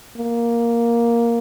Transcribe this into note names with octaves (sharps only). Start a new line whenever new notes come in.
A#3